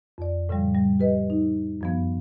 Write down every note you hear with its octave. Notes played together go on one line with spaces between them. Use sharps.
F2 D5
A2 C#3 F3 G3
G3
G4 B4 D#5
D#4
F#2 F3 B3